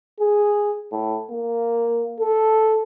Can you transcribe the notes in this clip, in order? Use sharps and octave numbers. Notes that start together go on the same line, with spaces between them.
G#4
A2
A#3
A4